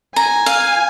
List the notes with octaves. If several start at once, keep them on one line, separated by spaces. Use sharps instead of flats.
G#5 A#5
F5